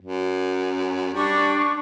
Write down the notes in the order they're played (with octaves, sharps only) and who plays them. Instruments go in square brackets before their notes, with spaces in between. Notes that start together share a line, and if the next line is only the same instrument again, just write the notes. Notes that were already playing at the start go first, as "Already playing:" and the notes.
[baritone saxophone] F#2
[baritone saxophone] G3 [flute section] D4 C#6